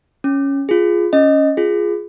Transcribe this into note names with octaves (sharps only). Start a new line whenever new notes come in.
C#4
F4 G#4
C#4 D#5
F4 G#4